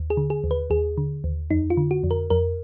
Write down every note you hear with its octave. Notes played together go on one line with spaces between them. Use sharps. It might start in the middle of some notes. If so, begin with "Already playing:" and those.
Already playing: D#2
G#4
D3
G#4
D#2
B4
D#2 G#4
D3
D#2
F2 D#4
F4
D3
F#4
F2
A#4
F2 A#4